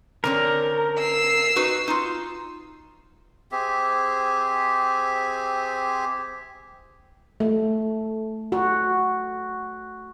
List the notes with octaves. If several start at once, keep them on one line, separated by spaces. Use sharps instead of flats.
D3 C4 C#4 A#4
E6 C7
D#4 F#4 B4
D#4 F4
C4 G4 G#4 E5
A3
F#4